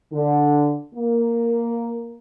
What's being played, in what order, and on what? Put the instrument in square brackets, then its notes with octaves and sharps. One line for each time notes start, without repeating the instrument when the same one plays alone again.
[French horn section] D3
A#3